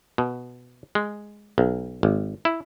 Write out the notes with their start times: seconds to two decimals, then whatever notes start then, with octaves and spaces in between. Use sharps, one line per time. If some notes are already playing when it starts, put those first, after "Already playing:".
0.18 B2
0.95 G#3
1.58 B1
2.03 G#1
2.45 E4